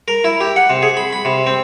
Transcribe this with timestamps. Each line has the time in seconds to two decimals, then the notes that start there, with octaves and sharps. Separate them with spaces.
0.08 A#4
0.24 E4
0.41 G4
0.56 F#5
0.70 C3
0.82 G#4
0.97 B5
1.13 B5
1.25 C3
1.47 C4